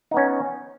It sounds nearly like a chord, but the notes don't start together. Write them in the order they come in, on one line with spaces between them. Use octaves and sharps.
D#4 B3 C#4